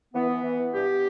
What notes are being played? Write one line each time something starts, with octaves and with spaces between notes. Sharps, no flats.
E3 B3
E3
E3
E3
G2 G4